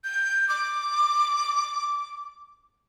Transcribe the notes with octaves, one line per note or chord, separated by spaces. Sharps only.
G6
D6